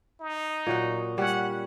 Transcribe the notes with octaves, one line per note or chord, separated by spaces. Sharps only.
D#4
A#2 F#3 F#5
G3 C#4 F#5